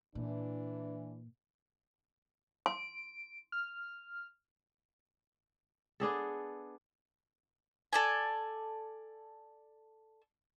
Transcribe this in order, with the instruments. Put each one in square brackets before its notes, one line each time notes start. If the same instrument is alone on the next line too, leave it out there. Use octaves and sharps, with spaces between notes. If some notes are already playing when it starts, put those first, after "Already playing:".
[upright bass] A#2 [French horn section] E3 D4
[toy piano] C6 [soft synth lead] D7
[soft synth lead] F6
[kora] B3 D4 G#4 A4
[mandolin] A4 D5 G#5